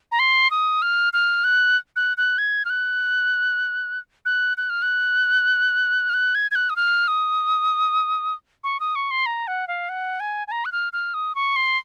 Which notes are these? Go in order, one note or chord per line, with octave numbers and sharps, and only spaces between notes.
A#5
C6
D#6
F6
F6
F#6
F#6
F#6
G#6
F6
F#6
F#6
F#6
F6
F#6
F6
F#6
G#6
G#6
F#6
D#6
F6
D#6
C#6
D#6
C#6
C6
A#5
F#5
F5
F#5
G#5
G#5
A#5
F#6
F6
F6
D#6
C#6
C6